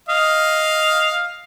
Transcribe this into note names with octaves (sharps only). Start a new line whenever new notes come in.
D#5 F5